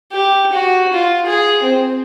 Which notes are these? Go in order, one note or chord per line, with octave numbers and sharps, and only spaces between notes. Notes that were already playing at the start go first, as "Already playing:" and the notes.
G4
F#4
F4
G#4
C4